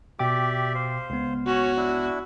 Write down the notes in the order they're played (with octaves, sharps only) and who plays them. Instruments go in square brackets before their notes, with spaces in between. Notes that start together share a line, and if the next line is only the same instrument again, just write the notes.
[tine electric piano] B2 G5 D6 [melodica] G4 D5 E5
[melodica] C5 F5
[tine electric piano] C#2 B3
[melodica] C#4 C#5 [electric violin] F#4
[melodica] D4 E4